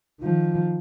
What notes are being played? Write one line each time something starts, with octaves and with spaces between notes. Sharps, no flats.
D#3 F3